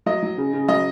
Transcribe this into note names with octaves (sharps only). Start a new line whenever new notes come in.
F#3 D#5
F#3
C#3
C#3
F#3 D#5